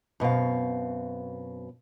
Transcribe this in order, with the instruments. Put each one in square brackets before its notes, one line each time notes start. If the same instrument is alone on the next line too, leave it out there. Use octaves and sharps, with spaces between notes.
[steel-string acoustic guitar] F#2 B2 C4 F5